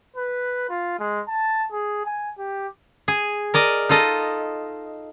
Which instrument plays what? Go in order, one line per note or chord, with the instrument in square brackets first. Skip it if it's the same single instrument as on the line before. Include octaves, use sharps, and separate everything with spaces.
[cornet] B4
F4
G#3
A5
G#4
G#5
G4
[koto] G#4
A#4 D5 D#5
D#4 F4 A4 D#5